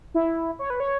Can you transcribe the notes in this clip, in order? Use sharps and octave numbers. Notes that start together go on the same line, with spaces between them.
E4
C#5
B4
C#5